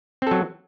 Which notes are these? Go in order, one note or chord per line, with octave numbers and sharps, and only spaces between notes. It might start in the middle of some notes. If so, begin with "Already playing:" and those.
F#3 C4 A4